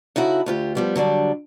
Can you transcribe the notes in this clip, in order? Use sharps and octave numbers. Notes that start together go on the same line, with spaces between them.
C#3 D#4 E4 F#4 A4
D2 F4 G4
F3 G3 B3
D3 F#3 G3 D4